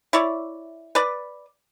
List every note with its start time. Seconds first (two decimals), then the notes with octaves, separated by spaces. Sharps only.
0.13 E4 C#5 D5
0.95 B4 D5